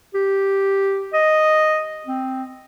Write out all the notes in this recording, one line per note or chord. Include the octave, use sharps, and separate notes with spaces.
G4
D#5
C4